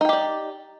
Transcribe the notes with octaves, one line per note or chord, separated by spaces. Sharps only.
D#4 G4 D5 G5